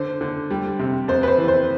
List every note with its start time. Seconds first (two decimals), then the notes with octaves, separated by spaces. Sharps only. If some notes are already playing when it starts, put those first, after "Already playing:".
Already playing: D3 C5
0.21 D3
0.51 G3
0.79 C3
1.08 F2 C5
1.23 B4
1.27 C5
1.38 E3
1.48 C5